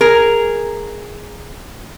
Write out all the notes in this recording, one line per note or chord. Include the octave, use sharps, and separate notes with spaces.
G#4 A#4